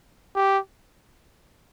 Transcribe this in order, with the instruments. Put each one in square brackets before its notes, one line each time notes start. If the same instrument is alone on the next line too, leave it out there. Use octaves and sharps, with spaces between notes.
[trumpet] G4